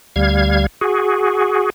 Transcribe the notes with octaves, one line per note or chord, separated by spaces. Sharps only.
D2 G3 F5 G#6
F#4 G#4